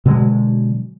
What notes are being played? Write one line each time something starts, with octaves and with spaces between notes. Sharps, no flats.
B2 D3 F#3 G#3